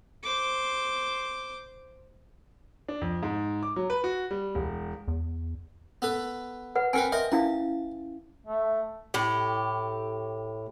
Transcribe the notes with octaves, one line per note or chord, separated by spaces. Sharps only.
C5 D6
D4
F2
G#2
D6
F#3
B4
F#4
G3
E1
E2
B3 A4 B4
B4 F#5
C4 A#4 B4 G5 G#5
A#4 C5 D#5 E5
C#4 E4 F5 A5
A3
A2 G4